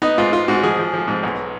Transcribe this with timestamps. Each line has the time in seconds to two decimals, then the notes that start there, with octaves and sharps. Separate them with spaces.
0.02 B3 D#4
0.18 G#2 F4
0.32 G#2 F4
0.48 G#2 F#4
0.63 F3 G#4
0.79 F3
0.94 F3
1.08 G#2
1.23 B1